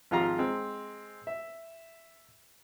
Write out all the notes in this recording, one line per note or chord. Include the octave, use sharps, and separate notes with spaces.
G#1 F3 F4 G4 F5 A#5
G#3 C4
E5